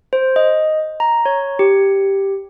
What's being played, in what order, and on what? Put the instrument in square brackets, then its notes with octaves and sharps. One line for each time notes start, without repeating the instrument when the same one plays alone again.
[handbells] C5
D#5
A#5
C#5
G4